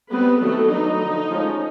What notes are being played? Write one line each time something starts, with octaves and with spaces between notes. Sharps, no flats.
G3 B3 C4 B4
D#3 F#3 A3 B3 A4
F#3 B3 D4 D#4
D3 F3 A3
F3 G#3 C#4